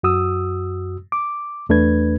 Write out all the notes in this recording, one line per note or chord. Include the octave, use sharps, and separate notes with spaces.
F#2 F#4 D#6 E6
D6
E2 A3 D4 B4 G#6